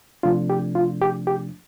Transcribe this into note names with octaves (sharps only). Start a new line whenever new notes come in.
C3 F3 A3 D4 F4
G4
F4
G4
G4